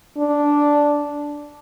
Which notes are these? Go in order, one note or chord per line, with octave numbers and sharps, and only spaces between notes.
D4